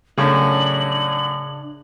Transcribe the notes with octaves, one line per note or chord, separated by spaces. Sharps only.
F#2 A2 C#3 C#4 D4 F#7